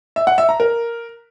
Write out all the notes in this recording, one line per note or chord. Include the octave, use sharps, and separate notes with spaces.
E5
F#5
E5
A#5
A#4